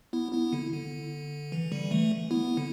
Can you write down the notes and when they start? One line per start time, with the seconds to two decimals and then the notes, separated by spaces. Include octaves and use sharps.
0.13 B3 E4
0.33 B3 E4
0.53 D3
0.72 D3
1.52 E3
1.72 D3 G3
1.91 E3 A3
2.31 B3 E4
2.57 D3